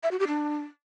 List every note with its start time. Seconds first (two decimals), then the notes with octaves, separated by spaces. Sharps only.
0.03 E5
0.11 F#4
0.19 G4
0.27 D4